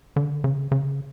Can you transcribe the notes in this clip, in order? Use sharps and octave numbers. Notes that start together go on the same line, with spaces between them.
D3
C#3
C#3